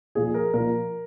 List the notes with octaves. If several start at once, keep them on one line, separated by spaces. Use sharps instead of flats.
A#2 F3 G#4
A#4
A#2 F3 A#4